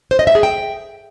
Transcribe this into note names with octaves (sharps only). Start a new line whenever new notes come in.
C5
D#5
E5
G#4
G5